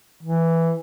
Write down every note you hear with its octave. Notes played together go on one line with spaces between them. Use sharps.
E3